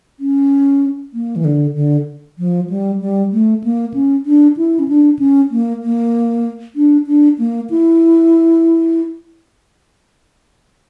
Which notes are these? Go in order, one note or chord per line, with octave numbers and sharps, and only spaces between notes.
C#4
A#3
E3
D3
D3
F3
G3
G3
A3
A#3
C#4
D4
E4
C#4
D4
C#4
A#3
A#3
D4
D4
A#3
E4